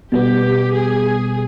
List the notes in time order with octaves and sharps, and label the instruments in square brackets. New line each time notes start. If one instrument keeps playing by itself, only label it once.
[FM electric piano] B2 G3 B3 [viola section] G4
[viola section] G#4